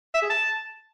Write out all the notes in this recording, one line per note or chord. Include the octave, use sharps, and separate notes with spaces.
E5
G#4
A5